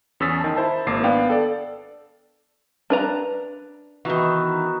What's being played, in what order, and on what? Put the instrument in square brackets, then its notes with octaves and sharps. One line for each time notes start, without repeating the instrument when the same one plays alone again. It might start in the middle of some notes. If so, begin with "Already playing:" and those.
[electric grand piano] E2 C#4 D#6 E6 A6 B6
D#3 A5
E4 C5 A5
G#1 A#3 D6 C7
B3 D4 D5 F5 G5
A4 D5
[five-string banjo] D4 B4 A#5
[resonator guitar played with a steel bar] D#3 E3 [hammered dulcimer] B3 D#4 F#4